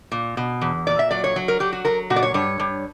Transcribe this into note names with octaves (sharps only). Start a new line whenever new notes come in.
A#2
B2
E2
A#2 D5
E5
F#3 D5
C#5
F#3
A#4
F#3 G4
F#4
F#3 A#4
A#2 F#4
D5
C#5
G2 C#5
G2